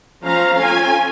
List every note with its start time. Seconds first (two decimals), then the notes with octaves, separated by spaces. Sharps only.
0.24 F3 C#4 C5 F5 A#5
0.54 C#4 F4 A4 G#5